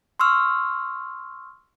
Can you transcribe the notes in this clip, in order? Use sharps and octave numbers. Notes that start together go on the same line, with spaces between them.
C6 C#6 E6 F6